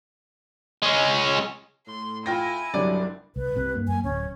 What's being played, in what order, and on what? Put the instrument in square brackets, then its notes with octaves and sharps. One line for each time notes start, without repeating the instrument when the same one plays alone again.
[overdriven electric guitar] G#3 C#4
[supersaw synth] A2 [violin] C6
[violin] E4 G#5 [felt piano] F4 G5 A#6
[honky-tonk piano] G1 C2 G3 [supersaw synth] F#3 D4 [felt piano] D5
[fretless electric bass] C2 [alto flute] B4
[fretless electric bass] C2 C3
G2 A#3
[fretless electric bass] F#2 A#3 [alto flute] G#5
[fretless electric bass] D1 [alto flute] C#4